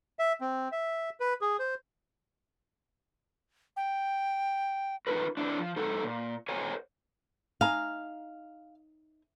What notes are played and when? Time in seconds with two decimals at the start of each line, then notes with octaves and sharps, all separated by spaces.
0.19 E5
0.41 C4
0.72 E5
1.20 B4
1.41 G#4
1.59 C5
3.77 G5
5.07 D#4 F4 A#4 B4
5.37 D4 E4 C5
5.59 F3
5.76 G#2 D#4 A4 C5 F#5
6.04 A#2
6.49 A#4 C5 C#5 F#5 G#5 A#5
7.61 D#4 F5 G#5 A#5